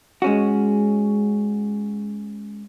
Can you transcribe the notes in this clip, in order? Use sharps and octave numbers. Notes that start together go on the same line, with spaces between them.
G#3 C#4 F#4